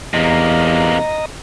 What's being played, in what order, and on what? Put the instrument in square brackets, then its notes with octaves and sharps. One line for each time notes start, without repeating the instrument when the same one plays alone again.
[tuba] E2 [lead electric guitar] C3 A#3 [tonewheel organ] D#5 A#5